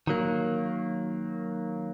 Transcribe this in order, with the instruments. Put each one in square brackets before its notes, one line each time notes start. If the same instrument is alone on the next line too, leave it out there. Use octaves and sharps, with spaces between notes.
[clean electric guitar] D#3 F#3 A#3